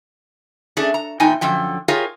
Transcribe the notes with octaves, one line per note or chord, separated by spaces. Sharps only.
A3 C#4 D4 G#4 A4
A#5
E2 A#2 D#4 G5 G#5
F#2 D3 F3 G5
F4 G4 G#4 A#4 C#5 F5